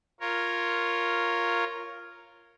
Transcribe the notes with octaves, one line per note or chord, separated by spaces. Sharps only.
F4 A#4 C#5